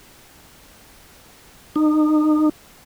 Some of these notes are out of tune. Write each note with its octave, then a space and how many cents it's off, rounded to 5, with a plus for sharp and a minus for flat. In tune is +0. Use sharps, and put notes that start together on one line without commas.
D#4 -30